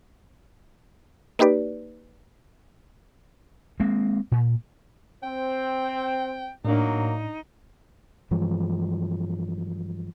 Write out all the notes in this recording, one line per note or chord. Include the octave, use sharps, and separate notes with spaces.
A#3 D#4 G4 B4 D5
G#3 A#3 C4
A#2
C4 G5
A2 F#3 A#3 D4 D#4
G2 E3 F3 G#3